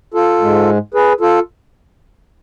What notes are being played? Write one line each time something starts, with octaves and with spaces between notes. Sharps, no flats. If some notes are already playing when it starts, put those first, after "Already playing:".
F4 A4
G#2 G#3
G#4 B4
F4 A4